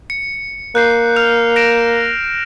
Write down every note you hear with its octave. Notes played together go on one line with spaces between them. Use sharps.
C#7
A#3 F#6 G6 C7
F6 F#6 F7
A#6 D7 E7